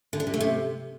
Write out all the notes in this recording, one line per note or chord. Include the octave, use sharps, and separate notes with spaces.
D3
D4
C3
A3
C3